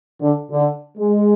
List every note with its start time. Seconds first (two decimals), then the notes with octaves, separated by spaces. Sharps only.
0.20 D3
0.51 D3
0.97 G#3